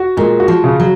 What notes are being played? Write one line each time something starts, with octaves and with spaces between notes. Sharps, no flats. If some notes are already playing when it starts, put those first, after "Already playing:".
Already playing: F#4
A#2 G#3
F#4
F3
C#3
F#3